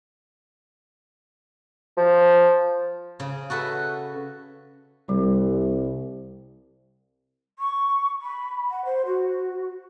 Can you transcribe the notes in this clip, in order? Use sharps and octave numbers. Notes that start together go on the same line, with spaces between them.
F3
C#3
F#4 A4 B4 E5
C2 G3
C#6
B5
F#5
C5
F#4